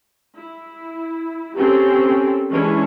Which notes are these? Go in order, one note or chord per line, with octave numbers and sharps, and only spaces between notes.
E4
A#3 C4 C#4 G4 A4
E3 G#3 C#4 D4 E4